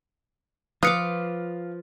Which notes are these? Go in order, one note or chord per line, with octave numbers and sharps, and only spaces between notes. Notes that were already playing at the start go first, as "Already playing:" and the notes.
F3 F4 B4 D6 D#6 C#7